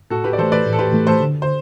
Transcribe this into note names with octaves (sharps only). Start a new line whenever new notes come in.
A2 F#4 A4
G4 B4
D5
E3 A3 A4 C5
B4 D5
A2
A4
G4 B4
E3 A3
A4 C5
D3
C5